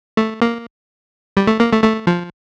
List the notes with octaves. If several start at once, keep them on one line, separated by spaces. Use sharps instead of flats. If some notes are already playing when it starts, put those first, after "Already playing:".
A3
A#3
G3
A3
A#3
A3
A3
F3